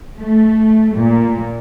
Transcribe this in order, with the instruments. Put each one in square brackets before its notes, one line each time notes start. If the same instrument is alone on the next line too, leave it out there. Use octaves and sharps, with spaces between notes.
[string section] A3
A#2